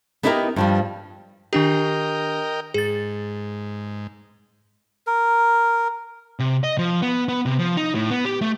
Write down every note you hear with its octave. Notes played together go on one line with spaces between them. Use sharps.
B3 D#4 E4 G4 A4 A#4
G2 F3 G3
D#3 D4 G4 A#4 D#5 G5
G#2 G#4 A6
A#4
C3
D#5
F3
B3
B3
C3
F3
D#4
A2
B3
G4
A3